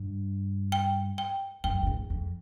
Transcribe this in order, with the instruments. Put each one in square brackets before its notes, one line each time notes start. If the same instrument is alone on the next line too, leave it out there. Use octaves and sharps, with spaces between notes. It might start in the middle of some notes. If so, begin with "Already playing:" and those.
Already playing: [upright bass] G2
[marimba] G5
G5
[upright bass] F#2 [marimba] G5
[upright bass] F2
E2
F2